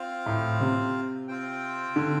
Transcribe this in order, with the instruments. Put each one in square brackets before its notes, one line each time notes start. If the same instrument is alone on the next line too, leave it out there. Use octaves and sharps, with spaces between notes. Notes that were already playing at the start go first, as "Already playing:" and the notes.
Already playing: [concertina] C4 F4 C5 F5
[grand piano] A2
C3
[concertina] C4 F4 C5 G5
[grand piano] D3